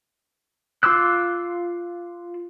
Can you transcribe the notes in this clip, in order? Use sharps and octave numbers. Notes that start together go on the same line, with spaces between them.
F4 C6 D6 E6 F#6